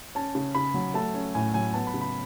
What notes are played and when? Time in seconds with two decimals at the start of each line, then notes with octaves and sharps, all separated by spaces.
0.15 C#4 A5
0.35 C#3
0.55 C#3 B5
0.74 F#3
0.94 A3 A5
1.14 C#4
1.35 A2 G#5
1.54 F#3 G#5
1.74 B3 A5
1.87 B5
1.94 C#3
2.01 B5